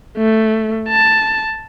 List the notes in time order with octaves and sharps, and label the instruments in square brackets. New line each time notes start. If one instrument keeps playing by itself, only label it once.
[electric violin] A3
A5